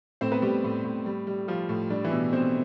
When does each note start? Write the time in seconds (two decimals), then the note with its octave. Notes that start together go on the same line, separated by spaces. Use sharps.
0.21 A2 C4 C5
0.32 B3 B4
0.42 A2 G3 G4
0.64 A2
0.84 A2
1.06 G3
1.27 G3
1.48 F3 G3 F4
1.69 A2
1.90 G3 D4
2.04 E3 E4
2.11 B2
2.33 B2 C4 C5